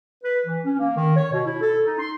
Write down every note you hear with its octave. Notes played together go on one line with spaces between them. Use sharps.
B4
E3
C#4
A#3
D#3
C#5
B2
E4
A4
D#4
C6